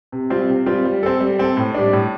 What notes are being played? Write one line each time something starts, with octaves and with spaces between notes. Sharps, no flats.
C3
G3 C4 F4
C3
G3 C4 F4
G3
C4 A4
G3
C4 A4
A2
G3 D4
A2